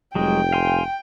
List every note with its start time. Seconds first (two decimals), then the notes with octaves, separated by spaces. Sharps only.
0.15 F1 F#3 G#3 G5
0.53 F5 G#5 C6